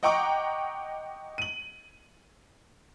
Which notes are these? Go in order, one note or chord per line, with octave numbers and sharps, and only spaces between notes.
D#5 F#5 G5 A#5 C#6 D6
D#7 F#7